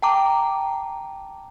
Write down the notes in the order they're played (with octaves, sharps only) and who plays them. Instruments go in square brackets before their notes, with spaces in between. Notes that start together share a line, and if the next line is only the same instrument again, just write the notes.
[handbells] G5 A5 A#5 D6